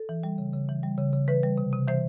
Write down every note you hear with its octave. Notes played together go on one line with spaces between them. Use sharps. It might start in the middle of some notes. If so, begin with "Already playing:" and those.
Already playing: A4
E3
G3
C#3
C#3
E3
G3
C#3
C#3
E3 B4
G3
C3
C3
E3 C5